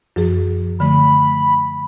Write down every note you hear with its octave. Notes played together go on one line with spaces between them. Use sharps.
F#2 F3 G#4
D3 F3 A3 B5